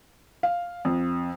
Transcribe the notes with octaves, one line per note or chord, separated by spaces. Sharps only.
F5
F2